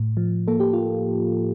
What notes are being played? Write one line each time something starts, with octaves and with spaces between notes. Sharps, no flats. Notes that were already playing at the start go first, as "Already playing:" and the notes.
Already playing: A2
F3
A#3 A4
G4
F4